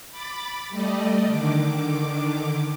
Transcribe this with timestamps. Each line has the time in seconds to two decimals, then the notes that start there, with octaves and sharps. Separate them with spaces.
0.11 B5 D6 A6
0.70 G3 A3 D5 D#5
1.27 D3 D#3 D6